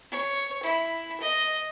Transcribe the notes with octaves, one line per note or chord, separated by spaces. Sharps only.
C#5
E4
D#5